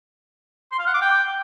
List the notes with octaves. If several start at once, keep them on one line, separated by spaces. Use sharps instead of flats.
C6
F5
F#5
D6
G5